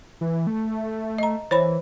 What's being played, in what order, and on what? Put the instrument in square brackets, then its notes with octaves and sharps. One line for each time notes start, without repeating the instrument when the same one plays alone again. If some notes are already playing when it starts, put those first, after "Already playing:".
[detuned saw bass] E3
A3
[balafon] D#5 A#5
[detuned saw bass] E3 [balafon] C5 C#5 B5